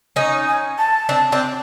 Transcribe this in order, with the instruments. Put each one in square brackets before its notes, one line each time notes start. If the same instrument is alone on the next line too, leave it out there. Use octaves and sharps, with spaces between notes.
[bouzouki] C#4 D#4
[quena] G#5
A5
[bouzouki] C4 D4
C4 D4